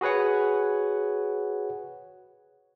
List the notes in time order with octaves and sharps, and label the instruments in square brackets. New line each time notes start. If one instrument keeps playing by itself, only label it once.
[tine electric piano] F#4 G#4 B4 C#5 F#5